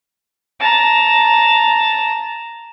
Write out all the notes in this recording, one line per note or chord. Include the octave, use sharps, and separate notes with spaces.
A5 A#5